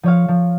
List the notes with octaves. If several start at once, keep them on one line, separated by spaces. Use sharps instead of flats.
F3 C#5 F5
F3